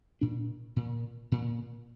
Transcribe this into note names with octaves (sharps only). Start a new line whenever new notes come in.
A#2 D4
A#2
A#2